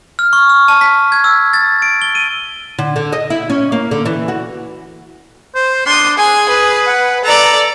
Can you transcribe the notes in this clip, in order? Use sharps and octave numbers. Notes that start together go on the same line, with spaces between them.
F6
C#6
F6
A5
B6
G#6
E6
A6
D7
G7
D#7
D3
D3
D#5
E4
C#4
A#3
D3
E3
F#4
C5
D4 C6 D#6
G#4 G#5
B4
F#5
A4 D5 A#5